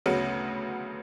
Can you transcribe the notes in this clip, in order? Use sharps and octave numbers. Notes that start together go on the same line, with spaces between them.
D2 C#3 F#3 B3